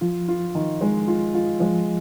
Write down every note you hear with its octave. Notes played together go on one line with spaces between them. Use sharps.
F3 F4
F4
D#3
G#3
F4
F4
F3 G#3